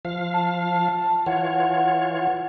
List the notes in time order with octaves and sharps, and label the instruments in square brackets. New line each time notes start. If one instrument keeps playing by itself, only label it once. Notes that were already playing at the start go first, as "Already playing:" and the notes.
[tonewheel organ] F3 F5
[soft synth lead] A5
[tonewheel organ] E3 F4 C#5 [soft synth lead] F#5